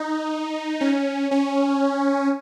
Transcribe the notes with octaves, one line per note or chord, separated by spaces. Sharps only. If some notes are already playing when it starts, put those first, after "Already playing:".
Already playing: D#4
C#4
C#4